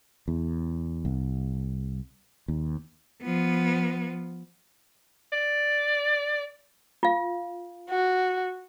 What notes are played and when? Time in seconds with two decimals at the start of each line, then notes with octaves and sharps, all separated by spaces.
0.28 E2
1.05 C2
2.48 D#2
3.23 F3 B3
5.32 D5
7.03 F4 F5
7.89 F#4